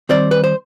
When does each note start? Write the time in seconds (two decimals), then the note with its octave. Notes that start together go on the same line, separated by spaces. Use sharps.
0.09 D#3 G3 C4 C5 D5
0.31 B4
0.44 C5